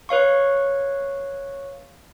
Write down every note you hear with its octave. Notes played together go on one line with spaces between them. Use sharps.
B4 C#5 F5 C#6